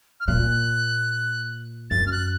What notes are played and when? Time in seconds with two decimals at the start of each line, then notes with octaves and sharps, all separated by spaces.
0.20 F6
0.27 A#2 F#6
1.90 F#2 A6
2.06 F6
2.11 F#6